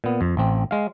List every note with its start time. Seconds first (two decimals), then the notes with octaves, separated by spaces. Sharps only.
0.04 A#2 B3
0.21 F2
0.37 A1 C4
0.71 G#3 F5